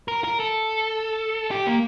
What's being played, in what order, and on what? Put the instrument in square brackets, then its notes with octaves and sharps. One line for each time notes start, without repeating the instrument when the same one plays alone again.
[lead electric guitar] A#4
A#4
A4
G4
A#3